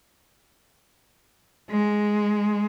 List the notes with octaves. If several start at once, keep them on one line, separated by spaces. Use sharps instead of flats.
G#3